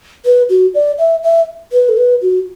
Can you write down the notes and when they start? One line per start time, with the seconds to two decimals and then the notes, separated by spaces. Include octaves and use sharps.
0.25 B4
0.49 F#4
0.74 D5
0.98 E5
1.23 E5
1.72 B4
1.89 A4
1.97 B4
2.22 F#4